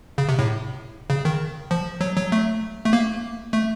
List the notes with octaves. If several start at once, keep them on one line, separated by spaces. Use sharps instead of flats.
C#3
C3
A2
C#3
D#3
F3
F#3
F#3
A3
A3
A#3
A3